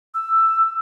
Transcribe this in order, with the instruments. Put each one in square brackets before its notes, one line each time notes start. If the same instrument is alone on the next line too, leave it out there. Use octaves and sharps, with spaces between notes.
[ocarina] E6